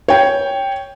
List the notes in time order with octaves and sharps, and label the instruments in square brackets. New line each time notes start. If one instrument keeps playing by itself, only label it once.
[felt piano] C#5 G5